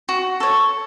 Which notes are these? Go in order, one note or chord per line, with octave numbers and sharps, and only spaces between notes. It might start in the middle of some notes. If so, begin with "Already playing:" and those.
F#4
A4 C#5